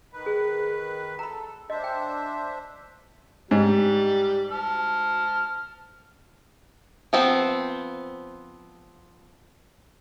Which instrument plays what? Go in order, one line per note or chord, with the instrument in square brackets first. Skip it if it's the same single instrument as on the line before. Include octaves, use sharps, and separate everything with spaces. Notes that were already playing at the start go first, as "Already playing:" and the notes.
[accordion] D#3 B4
[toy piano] G#4
[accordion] A4 [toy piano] A#5 B5
[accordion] D4 C5 E5 [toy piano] D#5
[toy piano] G5
[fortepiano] G#2 [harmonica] G3
[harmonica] A5 F6
[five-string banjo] F3 B3 C4